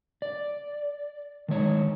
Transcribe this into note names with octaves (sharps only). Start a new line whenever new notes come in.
D5
D#3 G#3 C#5